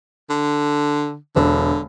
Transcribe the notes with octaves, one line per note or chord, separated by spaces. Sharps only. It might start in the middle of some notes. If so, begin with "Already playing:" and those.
D3
E1 D3